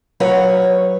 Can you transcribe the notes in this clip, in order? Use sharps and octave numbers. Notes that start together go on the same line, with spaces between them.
F#3 F#4 B4 C#5 F5